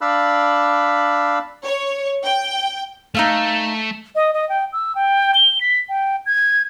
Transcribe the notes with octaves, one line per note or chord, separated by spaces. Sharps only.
D4 D5 F5 B5 E6 F#6
C#5
G5
A3 D#4 E5 F5
D#5
D#5
G5
E6
G5
G7
B6
G5
G#6